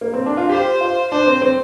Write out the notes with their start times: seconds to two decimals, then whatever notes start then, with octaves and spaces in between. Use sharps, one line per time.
0.01 A#3
0.14 C4
0.26 D4
0.37 F4
0.49 G4 C5
0.81 F4
1.11 D4 C5
1.26 C4
1.42 C4